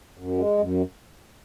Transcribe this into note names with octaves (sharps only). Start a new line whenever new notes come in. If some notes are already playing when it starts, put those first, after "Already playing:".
F#2
G#3
F#2